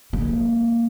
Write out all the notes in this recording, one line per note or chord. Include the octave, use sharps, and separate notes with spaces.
G#3 A#3